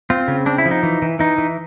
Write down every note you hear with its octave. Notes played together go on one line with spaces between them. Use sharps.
C4 F4
C#3
C4 D4
E4
F3
D#4
E3
E3
E3 D#4
E3